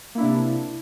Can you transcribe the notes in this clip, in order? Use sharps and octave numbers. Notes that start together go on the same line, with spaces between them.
C3 A#3 D4 E4